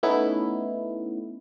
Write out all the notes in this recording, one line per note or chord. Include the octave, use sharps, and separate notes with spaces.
A3 B3 C#4 D#4 E4